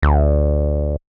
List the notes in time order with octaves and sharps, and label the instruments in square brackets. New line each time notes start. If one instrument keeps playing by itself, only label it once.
[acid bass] D2